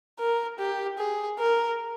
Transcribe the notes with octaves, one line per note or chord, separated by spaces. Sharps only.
A#4
G4
G#4
A#4